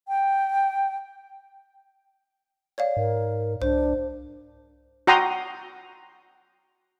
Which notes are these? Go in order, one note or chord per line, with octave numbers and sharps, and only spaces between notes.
G5
C#5 D5 F5
G#2 A#4
C2 D4 C5
F#4 F#5 G5 A#5 C6 D#6